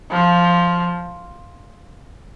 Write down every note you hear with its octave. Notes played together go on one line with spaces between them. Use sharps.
F3